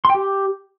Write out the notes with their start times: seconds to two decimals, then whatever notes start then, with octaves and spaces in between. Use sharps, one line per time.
0.05 C6
0.10 G5
0.15 G4